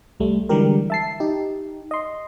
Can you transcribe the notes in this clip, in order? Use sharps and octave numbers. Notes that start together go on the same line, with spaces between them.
C2 G3 A3
D3 E3 G3 G#3 G4 A#4
E5 A5 C7
D#4 G4
D#5 C6